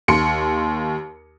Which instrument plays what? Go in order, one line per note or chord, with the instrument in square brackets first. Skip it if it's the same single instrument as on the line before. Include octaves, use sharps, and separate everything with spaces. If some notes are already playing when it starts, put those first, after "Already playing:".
[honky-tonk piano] D#2 C6 C#7